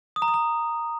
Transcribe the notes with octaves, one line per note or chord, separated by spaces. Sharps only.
D#6
A#5
D#6
A#5